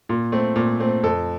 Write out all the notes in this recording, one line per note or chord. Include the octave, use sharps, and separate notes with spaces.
A#2
A3 C4
A#2
A3 C4
F2 A4